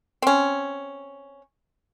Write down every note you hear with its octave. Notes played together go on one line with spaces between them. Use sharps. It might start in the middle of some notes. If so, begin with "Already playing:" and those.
C4 C#4